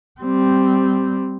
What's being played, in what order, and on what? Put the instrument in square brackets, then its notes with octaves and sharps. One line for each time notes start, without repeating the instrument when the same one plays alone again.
[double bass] G3 C4